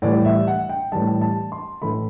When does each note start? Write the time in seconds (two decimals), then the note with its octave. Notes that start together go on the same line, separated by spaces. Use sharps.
0.02 A2 E3 G3 D5
0.25 E5
0.47 F#5
0.69 G5
0.92 A2 E3 G3 A5
1.21 A5
1.52 C6
1.82 A2 E3 A3 B5